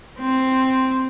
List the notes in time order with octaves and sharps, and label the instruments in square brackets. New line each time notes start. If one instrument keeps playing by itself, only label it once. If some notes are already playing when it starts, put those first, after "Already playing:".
[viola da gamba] C4